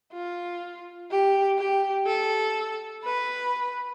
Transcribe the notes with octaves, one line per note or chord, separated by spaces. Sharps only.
F4
G4
G4
A4
B4